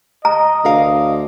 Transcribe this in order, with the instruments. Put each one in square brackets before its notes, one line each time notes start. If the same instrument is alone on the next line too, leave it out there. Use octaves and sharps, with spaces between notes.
[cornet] D#5 [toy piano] A#5
[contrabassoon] D2 [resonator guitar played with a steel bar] A#4 F5